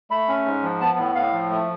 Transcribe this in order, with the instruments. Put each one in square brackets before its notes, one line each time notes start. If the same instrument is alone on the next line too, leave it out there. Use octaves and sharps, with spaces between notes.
[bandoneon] A3 B5
C#4
G#2
F3
B3 A5
A2
A2 F5
F3
A3